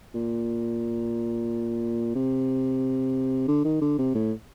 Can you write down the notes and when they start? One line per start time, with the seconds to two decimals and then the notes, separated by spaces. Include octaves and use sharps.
0.15 A#2
2.15 C3
3.48 D3
3.65 D#3
3.81 D3
3.98 C3
4.15 A2